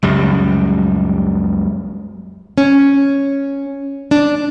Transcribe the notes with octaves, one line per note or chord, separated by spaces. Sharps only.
C#2 F#2 G3
C#4
D4